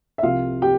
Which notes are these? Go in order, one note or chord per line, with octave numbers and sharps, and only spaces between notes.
E5
C2 C3 F3 F4 F5
G4 G5